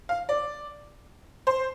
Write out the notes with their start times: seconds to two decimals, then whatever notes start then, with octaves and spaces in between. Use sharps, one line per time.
0.09 F5
0.29 D5
1.47 C5